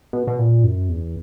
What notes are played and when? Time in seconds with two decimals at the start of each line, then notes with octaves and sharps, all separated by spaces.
0.13 B2
0.27 B2
0.39 A#2
0.64 F#2
0.89 E2